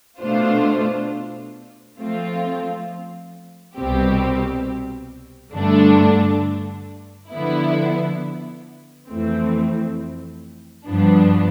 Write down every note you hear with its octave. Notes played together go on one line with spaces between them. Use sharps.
B2 A3 D4 F4 C5
F3 A3 C4 F4
C2 B2 G3 C4 G4
G2 D3 A3 D4
D3 F3 B3 E4
F2 E3 A3 C4
G2 F3 B3 D4